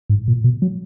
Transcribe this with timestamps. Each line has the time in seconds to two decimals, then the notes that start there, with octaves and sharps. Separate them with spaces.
0.10 G#2
0.28 A#2
0.44 B2
0.62 F#3